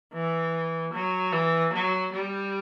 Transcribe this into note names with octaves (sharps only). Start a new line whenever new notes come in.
E3
F#3
E3
F#3
G3